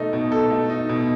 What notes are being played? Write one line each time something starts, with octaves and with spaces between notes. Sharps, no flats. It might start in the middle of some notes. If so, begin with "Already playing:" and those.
Already playing: B2 A3 D#4 A4
B2
A4
A3
D#4
B2